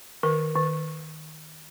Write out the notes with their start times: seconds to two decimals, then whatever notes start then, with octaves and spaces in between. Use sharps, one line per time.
0.23 D#3 A#4
0.55 D#3